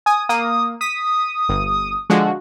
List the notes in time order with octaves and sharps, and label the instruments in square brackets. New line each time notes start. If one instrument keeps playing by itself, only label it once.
[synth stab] G#5 [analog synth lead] D#6
[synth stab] A#3 [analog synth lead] D#6
[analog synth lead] D#6 [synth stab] B6
[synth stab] G1
[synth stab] D3 F3 G#3 [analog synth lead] F#4